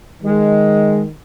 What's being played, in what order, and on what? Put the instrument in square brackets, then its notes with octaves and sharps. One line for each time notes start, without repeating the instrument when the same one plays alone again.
[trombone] D#3 [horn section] G#3